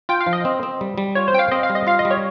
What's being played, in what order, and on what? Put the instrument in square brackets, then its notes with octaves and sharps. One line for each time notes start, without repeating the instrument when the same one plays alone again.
[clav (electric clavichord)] F4 [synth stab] G5
[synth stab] F5
[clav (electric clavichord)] F3
[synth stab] D#5
[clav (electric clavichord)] C4
C4
G3
G3
[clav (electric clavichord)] F4 [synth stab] C#5
[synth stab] C5
[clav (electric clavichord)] C4 [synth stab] G5
[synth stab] F5
[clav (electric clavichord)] C4 [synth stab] D#5
[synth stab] F5
[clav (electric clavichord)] G3
[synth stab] D#5
[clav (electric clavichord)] F4 [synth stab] F5
[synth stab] D#5
[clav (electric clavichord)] G3
[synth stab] C#5